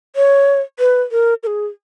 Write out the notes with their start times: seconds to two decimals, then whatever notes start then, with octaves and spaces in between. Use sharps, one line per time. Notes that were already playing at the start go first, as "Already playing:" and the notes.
0.16 C#5
0.79 B4
1.12 A#4
1.43 A#4
1.47 G#4